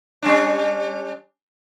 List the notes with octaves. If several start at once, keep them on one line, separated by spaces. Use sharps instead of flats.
G3 C#4 D4